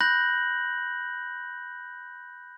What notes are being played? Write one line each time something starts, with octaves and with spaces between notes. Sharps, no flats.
B5 F#6 G6 A#6 F#7